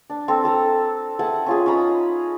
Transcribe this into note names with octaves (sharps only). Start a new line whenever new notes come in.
D4
C4 A4
C4 A4 A#5 E6
G#4 E5 F#5 A5
C#4 F4 G#4
C#4 D#4 A#5 B5